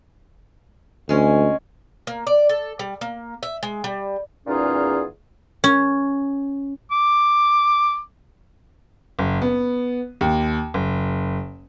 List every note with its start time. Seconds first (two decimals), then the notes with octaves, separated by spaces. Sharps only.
1.09 D2 G#3 C#4
2.07 A#3
2.27 D5
2.49 A4
2.79 G3
3.01 A#3
3.43 E5
3.63 G#3
3.84 G3
4.47 E2 A#2 C#4 D#4 F4 G#4
5.64 C#4
6.91 D6
9.19 F#1
9.42 B3
10.21 D#2
10.74 F#1